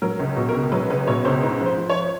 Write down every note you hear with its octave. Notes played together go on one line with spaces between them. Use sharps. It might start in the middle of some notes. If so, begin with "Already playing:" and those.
F#3 A#4
C#2
B2
A#4
C#2
F#3 B4
C#2 B4
B2 C#5
C#2 C5
G#2
F3
C5
F3
C#5